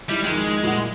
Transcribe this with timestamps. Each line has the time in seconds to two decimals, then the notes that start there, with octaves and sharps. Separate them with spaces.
0.09 G3 D#4 E4
0.24 F2 D#3 G#3
0.63 A#2 E4 F#5